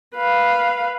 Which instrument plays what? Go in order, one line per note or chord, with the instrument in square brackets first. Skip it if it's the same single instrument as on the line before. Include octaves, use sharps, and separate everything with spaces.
[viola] B4 F5